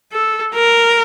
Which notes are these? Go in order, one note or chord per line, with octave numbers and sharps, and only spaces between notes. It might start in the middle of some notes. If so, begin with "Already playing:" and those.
A4
A#4